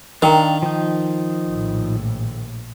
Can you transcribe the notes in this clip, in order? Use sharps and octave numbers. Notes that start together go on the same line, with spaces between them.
D#3 D4 A#4 F5 G5 A#5
F3 D#4
A#1 A2